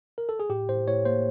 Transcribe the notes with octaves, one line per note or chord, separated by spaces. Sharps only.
A#4
A4
G#4
A2 G4
A2 C5
A2 C#5
A#3 C5